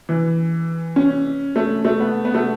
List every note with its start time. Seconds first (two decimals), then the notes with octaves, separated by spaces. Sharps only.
0.09 E3
0.96 C#4
1.56 A3
1.85 A3
2.00 B3
2.25 B3
2.35 A3